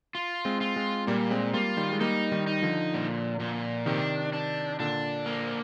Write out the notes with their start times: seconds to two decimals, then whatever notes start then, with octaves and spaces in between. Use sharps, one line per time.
0.15 F4
0.45 G#3 C4
0.61 F4
0.76 G#3 C4
1.07 A#2 G3 A#3
1.31 G#3 C4
1.54 G3 A#3 F4
1.77 D#3 G3
1.93 G#3
2.01 G3 A#3 D#4
2.32 D#3 G3
2.47 D#4
2.62 D3 F3
2.94 A#2
3.40 A#2
3.86 C3 D#3 D4
4.33 D4
4.80 A#2 D3 D4
5.26 A#3